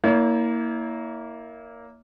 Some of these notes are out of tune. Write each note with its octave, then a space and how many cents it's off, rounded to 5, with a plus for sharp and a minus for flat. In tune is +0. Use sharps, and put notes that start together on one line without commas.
A#3 +0 E4 -25 C#5 +40